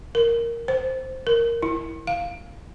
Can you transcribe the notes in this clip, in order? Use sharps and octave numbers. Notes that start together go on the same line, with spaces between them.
A#4
C5
A#4
E4
F5